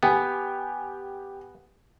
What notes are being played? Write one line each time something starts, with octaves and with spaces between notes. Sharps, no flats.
B3 G4 G#5